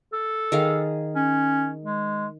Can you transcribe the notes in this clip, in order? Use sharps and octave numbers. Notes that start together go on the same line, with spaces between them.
A4
D#3 G#4 F5
C#4
G#3